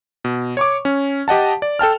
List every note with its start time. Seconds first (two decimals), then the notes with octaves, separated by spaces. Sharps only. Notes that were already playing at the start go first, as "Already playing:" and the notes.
0.25 B2
0.57 C#5 C#6 D6
0.85 C#4
1.28 G4 D#5 F#5 A5
1.62 D5
1.79 A4 G5 A5 F6